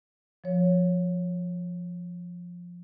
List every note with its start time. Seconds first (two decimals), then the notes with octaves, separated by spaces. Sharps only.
0.44 F3 C#5